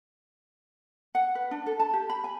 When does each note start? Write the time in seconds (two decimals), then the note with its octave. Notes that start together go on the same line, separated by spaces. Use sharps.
1.15 F#5
1.35 B4
1.51 D4
1.66 A4
1.80 A5
1.93 G4
2.10 B5
2.24 G#5